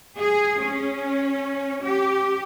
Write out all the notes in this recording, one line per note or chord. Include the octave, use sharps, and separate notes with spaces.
G#4
C#4
G4